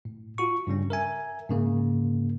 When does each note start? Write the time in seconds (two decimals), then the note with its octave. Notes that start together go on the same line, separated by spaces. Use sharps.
0.05 A2
0.38 F4 F#4 C#6
0.67 G2 C#3 G3 C#4
0.90 A#4 E5 G#5
1.49 G#2 C#3 A#3